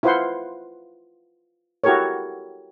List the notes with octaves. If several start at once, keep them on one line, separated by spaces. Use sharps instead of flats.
E4 F4 B4 C5 F#5 C6
E4 F#4 G4 A4 A#4 C#5